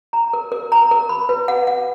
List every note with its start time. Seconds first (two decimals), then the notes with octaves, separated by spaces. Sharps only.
0.13 A#5
0.33 A#4
0.52 A#4
0.72 A#5
0.91 A#4
1.09 B5
1.29 B4
1.48 F#5
1.67 F#5